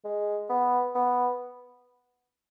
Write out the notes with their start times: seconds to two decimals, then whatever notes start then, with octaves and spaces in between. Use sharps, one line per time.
0.04 G#3
0.49 B3
0.95 B3